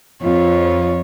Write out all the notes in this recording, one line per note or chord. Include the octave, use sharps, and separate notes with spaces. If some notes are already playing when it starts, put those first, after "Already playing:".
F2 F4 C#5